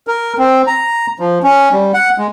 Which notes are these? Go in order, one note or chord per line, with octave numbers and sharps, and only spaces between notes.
A#4
C4
A#5
F3
C#4
G3
F#5
G#3